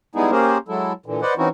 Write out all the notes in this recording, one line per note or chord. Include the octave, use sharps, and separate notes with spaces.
G3 G#3 B3 D#4 E4 G#4
A#3 C#4 G4 G#4 A#4 C5
F#3 G#3 E4 A4
A#2 D3 E3
B4 C5 D5 D#5 F#5
E3 C4 C#4 D#4 E4 F#4